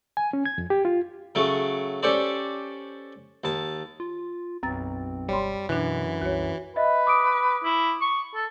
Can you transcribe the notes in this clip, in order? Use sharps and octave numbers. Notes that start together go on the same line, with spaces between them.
G#5
C#4
G#6
F2
G4
F4
C#3 F#3 A3 C#4
C#4 G4 A4 C5 D5
D#2 A5
F4
B1 F#2 C4 A6
E1 G3 C#5 B5 C6
F#2 B2 E3 D4 F#6
C2 F#4 C#5
B4 D#5 E5
D6 D#6 D7
E4
C#6
A4